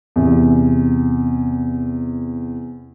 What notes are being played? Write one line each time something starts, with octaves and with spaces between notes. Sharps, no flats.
E2 C3